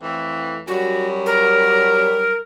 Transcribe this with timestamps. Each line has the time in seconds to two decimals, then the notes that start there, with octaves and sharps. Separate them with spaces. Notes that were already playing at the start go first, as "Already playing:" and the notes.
0.01 F2 A2 E3
0.68 F#2 F#3 G3 F#4
1.26 A#4